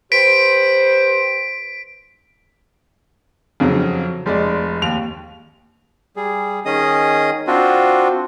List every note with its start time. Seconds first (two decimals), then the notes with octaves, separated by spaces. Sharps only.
0.12 G4 B4 C5 B6 D7
3.60 F2 C#3 F#3
4.26 F1 G#3 D5
4.82 D#2 F7
6.16 G3 G#4
6.65 D#3 C#4 G#4 D#5 D#6
7.47 C4 D4 F4 F#4